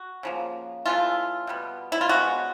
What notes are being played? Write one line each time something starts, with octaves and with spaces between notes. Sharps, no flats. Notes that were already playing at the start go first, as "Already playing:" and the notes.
Already playing: F#4
C#3 F3 A#3
C#3 E3 A3 F4
B2 G3 B3
E4
F4
C#3 F3 G#3 B3 F#4